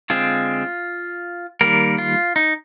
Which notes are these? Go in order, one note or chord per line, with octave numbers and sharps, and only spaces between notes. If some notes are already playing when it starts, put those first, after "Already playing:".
D3 G#3 C4 F4
D#3 G3 A#3 A#4
F4
D#4